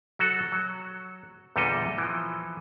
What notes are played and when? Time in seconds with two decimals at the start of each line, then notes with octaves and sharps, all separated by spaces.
0.19 F#3 F#4 A4
0.52 F#3
1.56 E2 A#2 D3 G3 A4 D#5
1.98 E3 F3